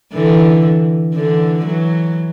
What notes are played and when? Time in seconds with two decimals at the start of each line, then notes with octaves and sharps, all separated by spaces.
0.13 D3 E3
1.15 D3 E3
1.66 E3 F#3